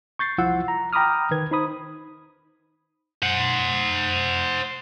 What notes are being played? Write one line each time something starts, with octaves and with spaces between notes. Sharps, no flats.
C#6 G6 A6 C7
C2 F3 E4 F4 F#5 E6
A#5
G5 A#5 B5 D6 D#6 F6
D#3 B4 G#6
D#4 C5 B5 D#6
C5 F#5